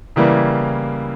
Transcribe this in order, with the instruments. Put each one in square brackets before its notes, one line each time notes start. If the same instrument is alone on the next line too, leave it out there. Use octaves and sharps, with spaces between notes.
[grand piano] C#3 E3 G3 A#3 E4